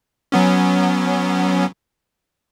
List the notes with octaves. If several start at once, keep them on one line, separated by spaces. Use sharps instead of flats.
F#3 B3 C#4